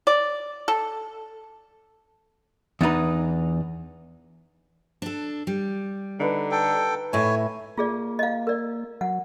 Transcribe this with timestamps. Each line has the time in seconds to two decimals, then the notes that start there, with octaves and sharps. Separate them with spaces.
0.07 D5
0.68 A4
2.81 E2 D4 D#4 B4
5.02 D4 A4
5.47 G3
6.19 D3 D#4 B4 A5
6.51 A4 G5
7.13 A2 A3 E4 A4 C#5 E5 G#5
7.78 A#3 F4 G#4 D5
8.19 D#5 F5
8.47 A#4 D5
9.01 F#3 F#5